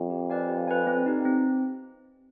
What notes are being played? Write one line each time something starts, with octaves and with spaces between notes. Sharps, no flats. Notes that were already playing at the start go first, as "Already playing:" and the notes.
Already playing: F2
G4
B4 D5 F5 G#5
G4
B4 D5 F5 G#5
C4
D#4 G4
C4